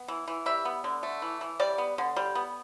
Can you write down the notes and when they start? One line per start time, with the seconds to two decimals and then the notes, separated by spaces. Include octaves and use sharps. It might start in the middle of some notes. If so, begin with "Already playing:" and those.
Already playing: B3
0.08 E3
0.28 E3
0.46 G3 E5
0.65 B3
0.84 D3
1.03 A3
1.22 E3
1.41 E3
1.59 G3 D5
1.78 B3
1.98 D3
2.16 G3
2.35 B3